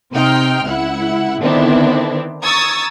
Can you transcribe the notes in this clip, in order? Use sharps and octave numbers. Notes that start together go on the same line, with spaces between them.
C3 C4 D#4 G5 C6 F6
C#2 E4 F#5
D3 D#3 B3 C4 D4 E4
A#5 C#6 D#6 E6 G#6 A6